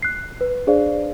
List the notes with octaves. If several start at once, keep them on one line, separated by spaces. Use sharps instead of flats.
F#6 C7
B4
D4 G#4 C5 D5 F5